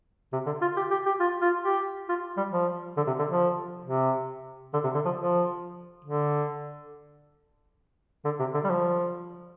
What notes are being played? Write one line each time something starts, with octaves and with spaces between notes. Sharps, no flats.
C3
D3
F4
G4
G4
G4
F4
F4
G4
F4
G3
F3
D3
C3
D3
F3
C3
D3
C3
D3
F3
F3
D3
D3
C3
D3
G3
F3